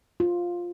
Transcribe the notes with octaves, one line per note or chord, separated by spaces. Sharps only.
F4